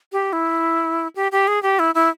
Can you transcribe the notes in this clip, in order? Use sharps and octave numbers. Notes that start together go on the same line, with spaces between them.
G4
E4
G4
G4
G#4
G4
E4
E4